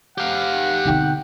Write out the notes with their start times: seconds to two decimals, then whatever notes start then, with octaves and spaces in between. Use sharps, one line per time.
0.18 G4 F5 F#5
0.85 B2 D3 C4 D#4 G5